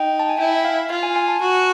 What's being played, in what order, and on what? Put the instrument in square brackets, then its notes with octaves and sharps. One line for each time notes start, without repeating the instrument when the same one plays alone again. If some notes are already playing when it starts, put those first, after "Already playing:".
Already playing: [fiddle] D#4 [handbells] G5
[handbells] A5
G#5
[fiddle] E4 [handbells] G5
[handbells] F5
[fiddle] F4 [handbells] F5
[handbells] G#5
G#5
A5
[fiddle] F#4